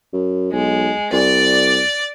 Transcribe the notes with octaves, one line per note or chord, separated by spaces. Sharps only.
F#2
B1 G#3
C2 D5 D6